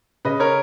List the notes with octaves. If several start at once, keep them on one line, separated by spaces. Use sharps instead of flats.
C#3 B4 D#5
A#4 C#5